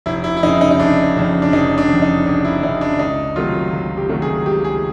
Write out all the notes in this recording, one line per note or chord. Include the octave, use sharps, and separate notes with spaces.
F1 E4
E4
E4
F2 C#3 D#4
D#4
D#4
F1 D4
F2 C#3
D4
F1 D#4
D4
F2 C#3
D#4
F1 D4
E4
F2 D#4
C#3
D4
C#2 D#4
C3 D#3 F#3 A3 F4
C#2
G4
C3 D#3 F#3 A3
G#4
C#2 G4
G#4